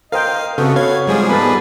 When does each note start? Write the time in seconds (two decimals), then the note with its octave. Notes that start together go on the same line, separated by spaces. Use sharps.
0.12 A#4 C5 D#5 F5 G5
0.58 C#3 B3 C4 F#4 A4
0.76 B4 C#5 F5 G#6
1.07 G#2 F3 G3 G#4
1.29 B3 A4 B4 A5